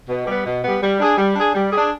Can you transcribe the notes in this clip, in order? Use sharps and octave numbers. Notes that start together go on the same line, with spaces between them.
B2
G3 B3
B2
G3 B3
G3
D4 G#4
G3
D4 G#4
G3
D4 G#4